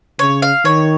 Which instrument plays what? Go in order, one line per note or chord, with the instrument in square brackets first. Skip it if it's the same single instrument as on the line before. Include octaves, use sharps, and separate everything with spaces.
[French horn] C#3 [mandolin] C#5
[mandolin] F5
[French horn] D#3 [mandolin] C#5